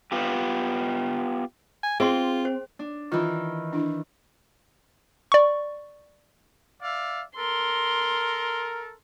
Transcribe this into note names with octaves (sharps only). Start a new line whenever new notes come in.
B3 F4 G4
G#5
C4 F4 G#4 D#5 C6
C5
D4
D#3 E3 F4
D4 E4
D5 C#6
D5 E5 F5
A4 A#4 C6